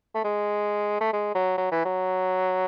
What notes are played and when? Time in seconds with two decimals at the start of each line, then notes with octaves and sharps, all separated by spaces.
0.15 A3
0.24 G#3
1.00 A3
1.13 G#3
1.34 F#3
1.57 F#3
1.72 E3
1.85 F#3